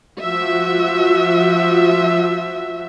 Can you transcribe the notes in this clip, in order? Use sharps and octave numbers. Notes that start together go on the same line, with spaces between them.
F3 F#4 E5